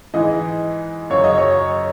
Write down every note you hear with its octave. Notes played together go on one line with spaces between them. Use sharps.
G#2 E3 D#5
F#2 C#3 F#3 C#5
D#5
C#5